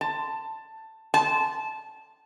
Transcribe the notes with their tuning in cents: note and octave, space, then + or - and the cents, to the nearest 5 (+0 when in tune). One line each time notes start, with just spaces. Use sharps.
A5 +10
A5 -15